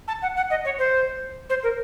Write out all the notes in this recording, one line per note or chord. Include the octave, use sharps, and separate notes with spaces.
A5
F#5
F#5
D#5
C#5
C5
C5
A#4